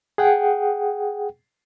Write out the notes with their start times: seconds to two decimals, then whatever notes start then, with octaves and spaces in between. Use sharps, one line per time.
0.18 G#4 F#5 G5